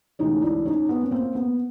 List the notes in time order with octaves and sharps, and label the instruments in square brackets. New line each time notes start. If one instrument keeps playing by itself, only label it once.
[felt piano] D2 C3 E3 G#3 C#4 D#4
D4 E4
C#4 D#4
B3 C#4
B3
A#3 C4
B3